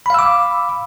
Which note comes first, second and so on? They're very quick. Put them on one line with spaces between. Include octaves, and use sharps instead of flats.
B5 F5 E6 D6